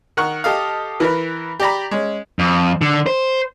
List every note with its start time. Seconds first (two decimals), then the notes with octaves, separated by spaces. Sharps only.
0.17 D#3 F#5 C#6
0.44 G4 A4 D#5 F5
1.00 E3 A#4 B4
1.60 G4 D5 A#5 B5
1.91 G#3 C#4
2.39 F2
2.81 D3
3.06 C5